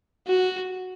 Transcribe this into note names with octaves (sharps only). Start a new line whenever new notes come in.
F#4